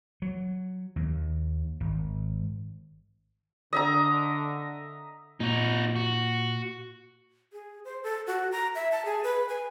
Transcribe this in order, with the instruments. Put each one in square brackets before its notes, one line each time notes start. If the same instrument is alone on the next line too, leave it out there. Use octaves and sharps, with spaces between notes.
[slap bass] F#3
D#2
G#1
[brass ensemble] D3 [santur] D#5 E5 A#5
[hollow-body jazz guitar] A#2 [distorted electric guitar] D#4 F#4
[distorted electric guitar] F#4
[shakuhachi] G#4
C5
A4
F#4
A#5
E5
A5
G#4
B4
G#5